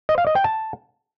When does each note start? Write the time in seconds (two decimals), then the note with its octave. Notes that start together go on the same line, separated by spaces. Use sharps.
0.09 D#5
0.18 F5
0.27 D#5
0.35 G5
0.44 A5